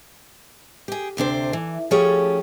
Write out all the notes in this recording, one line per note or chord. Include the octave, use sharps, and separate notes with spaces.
G4 G#4
D2 C3 D4 C5
E3
F3 A3 C#4 G4 G#4 C#5